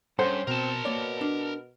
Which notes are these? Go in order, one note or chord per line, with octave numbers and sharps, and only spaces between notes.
G2 C#4 G#4 A4 C5 F#5
B2 C4 A#4 A5
B2 A#3 C#5 D5
D4